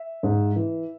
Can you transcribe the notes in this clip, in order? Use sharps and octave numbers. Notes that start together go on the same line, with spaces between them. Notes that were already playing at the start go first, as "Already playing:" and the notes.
Already playing: E5
G#2
E3